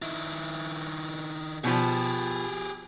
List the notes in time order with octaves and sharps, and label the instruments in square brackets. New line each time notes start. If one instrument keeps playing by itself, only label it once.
[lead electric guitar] D#3 E4
[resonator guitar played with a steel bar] B2 F3 [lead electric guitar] G4 G#4